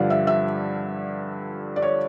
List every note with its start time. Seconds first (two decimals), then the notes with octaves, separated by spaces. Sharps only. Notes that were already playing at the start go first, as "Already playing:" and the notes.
Already playing: G2 D3 F3 D5 F5
0.10 E5
0.27 E5
1.76 D5
1.82 C#5